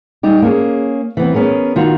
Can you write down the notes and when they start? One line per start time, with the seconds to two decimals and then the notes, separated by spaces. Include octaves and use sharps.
0.23 G3 D#4 G4
0.42 A#3 C#4 G#4
1.17 E3 B3 C4
1.34 B3 C#4 G#4 A#4
1.76 D#3 F4 F#4